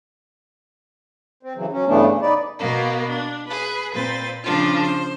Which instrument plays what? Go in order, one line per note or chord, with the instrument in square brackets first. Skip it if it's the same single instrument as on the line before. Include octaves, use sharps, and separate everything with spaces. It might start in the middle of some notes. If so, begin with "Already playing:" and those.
[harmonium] C4
C#3 E3 F#3
F#3 C#4
G2 C#3 E3 A3 B3 D4
C#3
D#4 B4 D5
[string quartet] B2 A#3 B3
D4
G#4 B4
A#2 C4 B4 C5 A6
C#3 F3 D4 F4
C5